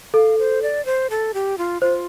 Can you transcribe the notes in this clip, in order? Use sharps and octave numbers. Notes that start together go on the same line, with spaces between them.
A4 F5
C5
D5
C5
A4
G4
F4
F4 C5